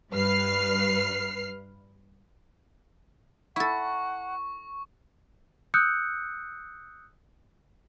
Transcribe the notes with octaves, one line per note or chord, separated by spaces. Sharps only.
G2 B4 F6 C7
E4 A4 F#5 C#6
D#6 E6 F#6 G6 C#7